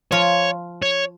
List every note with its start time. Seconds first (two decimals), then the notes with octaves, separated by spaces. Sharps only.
0.12 F3 F4 C#5
0.82 C#5